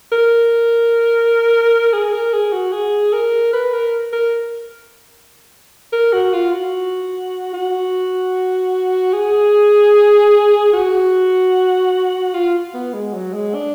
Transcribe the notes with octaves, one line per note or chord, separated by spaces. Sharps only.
A#4
G#4
A#4
G#4
F#4
G#4
A#4
B4
A#4
A#4
A#4
F#4
F4
F#4
F#4
G#4
F#4
F4
B3
G#3
F#3
G#3
D4